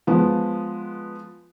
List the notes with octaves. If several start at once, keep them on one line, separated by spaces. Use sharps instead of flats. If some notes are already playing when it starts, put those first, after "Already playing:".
F3 G#3 B3